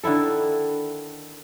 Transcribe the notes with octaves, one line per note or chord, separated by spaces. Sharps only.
D3 D#3 E4 A4